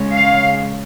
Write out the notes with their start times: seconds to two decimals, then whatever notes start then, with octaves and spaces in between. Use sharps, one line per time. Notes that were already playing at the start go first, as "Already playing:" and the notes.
Already playing: C#3 G#3 C#4
0.14 F5